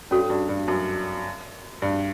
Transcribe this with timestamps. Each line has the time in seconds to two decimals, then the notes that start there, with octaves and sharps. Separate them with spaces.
0.11 G2 C#4 F#4 A4 C#5
0.30 G2
0.49 G2
0.68 F#2
1.82 G2